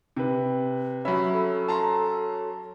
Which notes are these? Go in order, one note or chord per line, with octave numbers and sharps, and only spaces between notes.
C3 B4
F#3 C#4 E5 B5
A4
A5 A#5 C6